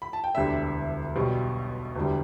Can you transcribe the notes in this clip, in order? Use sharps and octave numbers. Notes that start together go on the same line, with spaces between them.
B5
A5
G5
E1 D2 D3 G3 E5
B1 B2 G3
E1 D2 D3 G3